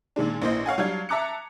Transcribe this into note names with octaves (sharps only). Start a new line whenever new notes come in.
A#2 D#3 G#3 D4
A#1 E3 A#3 C5 D#5
C#5 F5 F#5 G#5
F#3 G3 D4 F5 G#6
E5 A5 A#5 D6 F#6 C#7